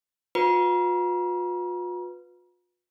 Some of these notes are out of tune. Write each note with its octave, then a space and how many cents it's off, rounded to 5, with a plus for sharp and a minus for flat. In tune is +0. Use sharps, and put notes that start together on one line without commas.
F4 +45 B4 +5 A#5 +40